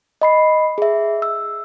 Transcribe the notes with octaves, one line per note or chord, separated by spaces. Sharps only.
D#5 B5 C7
G#4 E5
E6